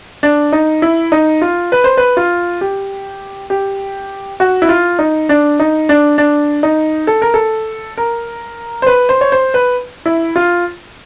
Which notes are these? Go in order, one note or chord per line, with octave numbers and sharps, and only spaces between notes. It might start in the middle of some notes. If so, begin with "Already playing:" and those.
D4
D#4
E4
D#4
F4
B4
C5
B4
F4
G4
G4
F#4
E4
F4
D#4
D4
D#4
D4
D4
D#4
A4
A#4
A4
A#4
C5
B4
C5
C#5
C5
B4
E4
F4